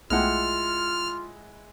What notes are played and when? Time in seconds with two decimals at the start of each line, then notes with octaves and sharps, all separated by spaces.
0.10 B1 G#3 A3 E4 F4 F#5 G5 F6